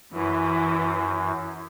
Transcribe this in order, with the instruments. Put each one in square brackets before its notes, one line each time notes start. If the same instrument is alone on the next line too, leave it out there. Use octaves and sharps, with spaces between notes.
[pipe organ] F#2 [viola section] E3